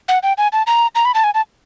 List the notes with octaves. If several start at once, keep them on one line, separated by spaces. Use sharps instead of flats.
F#5
G5
G#5
A5
A#5
A#5
B5
A5
G#5
A5